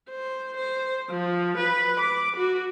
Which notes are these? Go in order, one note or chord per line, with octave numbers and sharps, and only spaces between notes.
C5
C5
F3
B4
D6
F#4